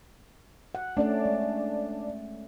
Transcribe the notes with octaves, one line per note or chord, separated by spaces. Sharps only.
F#5
A3 C#4 D4 D5
G#3